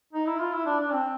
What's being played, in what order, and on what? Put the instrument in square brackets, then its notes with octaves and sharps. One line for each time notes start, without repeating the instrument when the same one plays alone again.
[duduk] D#4
E4
F4
E4
D4
D4
C4